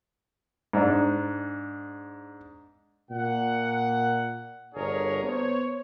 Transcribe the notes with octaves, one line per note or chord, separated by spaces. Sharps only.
G#2 D4
A#2 F#5
G1 D4 G#4 A#4 C#5
B3 C5 C#5